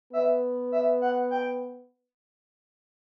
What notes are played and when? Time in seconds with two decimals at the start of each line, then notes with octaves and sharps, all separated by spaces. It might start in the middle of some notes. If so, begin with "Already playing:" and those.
0.13 B3 E5
0.72 E5
1.02 F#5
1.31 G5